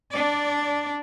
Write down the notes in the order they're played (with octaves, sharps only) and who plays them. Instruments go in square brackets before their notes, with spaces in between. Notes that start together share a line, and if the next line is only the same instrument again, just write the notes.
[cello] D4 D5